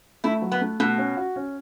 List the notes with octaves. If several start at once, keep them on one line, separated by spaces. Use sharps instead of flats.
A3 E4
F#3
B3
A3
B2 A3
C#4
F#4
C#4